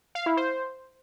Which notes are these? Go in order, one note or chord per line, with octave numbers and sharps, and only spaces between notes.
F5
E4
C5